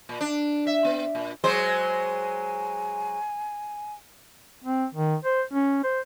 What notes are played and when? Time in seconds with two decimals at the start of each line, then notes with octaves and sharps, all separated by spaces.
0.09 A#2
0.21 D4
0.67 E5
0.85 B3
1.15 A#2
1.44 F#3 G#3 C5 G#5
4.63 C4
4.94 D#3
5.25 C5
5.53 C#4
5.84 C5